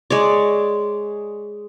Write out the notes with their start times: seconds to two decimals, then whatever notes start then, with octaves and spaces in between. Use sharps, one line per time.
0.10 G#3 C#5 D5